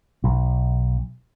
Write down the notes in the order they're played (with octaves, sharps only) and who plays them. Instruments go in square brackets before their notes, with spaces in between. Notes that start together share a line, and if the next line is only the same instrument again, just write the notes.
[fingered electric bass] B1